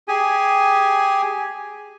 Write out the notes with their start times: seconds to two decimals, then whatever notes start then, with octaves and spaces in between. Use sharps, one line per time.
0.08 G4 G#4 G#5